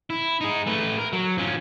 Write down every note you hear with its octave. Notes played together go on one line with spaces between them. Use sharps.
E4
D#4 G#4
A3 B4
A#4
F#3
F3 C#4